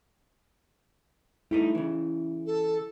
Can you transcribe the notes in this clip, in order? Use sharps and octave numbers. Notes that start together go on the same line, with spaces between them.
G3 A3 D#4 E4
C#3 E3
A4